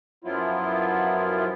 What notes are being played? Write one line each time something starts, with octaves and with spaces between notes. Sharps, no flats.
F#2 F3 F#3 B3 E4 F4